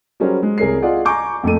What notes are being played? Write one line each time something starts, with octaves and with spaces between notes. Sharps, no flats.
F#3 G3 C#4 G#4 A#4 C5
G#3
C2 G#4 A#4 C#5 C7
F4 G#4 D5 D#5 F#5
G#5 A#5 C#6 D6 G6
F2 A3 A#3 A4 D#7